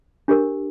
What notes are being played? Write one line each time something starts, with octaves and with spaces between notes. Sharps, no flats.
D4 G4 A#4